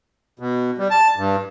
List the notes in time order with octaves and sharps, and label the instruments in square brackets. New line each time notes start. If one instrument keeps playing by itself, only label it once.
[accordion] B2
G3
A5
G2